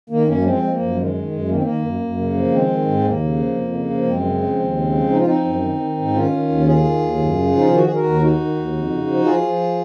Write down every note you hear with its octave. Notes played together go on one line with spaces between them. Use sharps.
D#3 A#3
F#2 A#3 C#4
A#3
F3 G#3 C4
F3 G#3
A#3
F#2
D#3 G#3
D#3
F#2
D#3 A#3
C4
D#3 A#3
F#2
F#2
C#3
F3
D#3 G#3 C4
D#3
G#2
D#2 A#3
C#3
F3
F2
C#3
F3
F#2 G#3 C4
C#3
F3
D#2
C#3
F3
F3 D#4
F4
F3 C4 D#4
F#2
D#3
D#3
G#2
D#3 C#4 F4
D#3
D#2
D#3 F4 G#4
D#3
D#2
F#2
C#3
F3
D#4
D#3 F4
F#4
D#3 G#4
F#4 A#4
D#2
D#3 D#4 F#4
D#3
D#2
F2
C#3
F3
F3 F4 G#4
F3